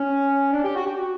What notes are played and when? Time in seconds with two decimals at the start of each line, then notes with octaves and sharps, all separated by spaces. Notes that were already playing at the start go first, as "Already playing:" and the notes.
Already playing: C#4
0.52 D4
0.63 G4
0.75 F#4
0.86 G4
0.97 F#4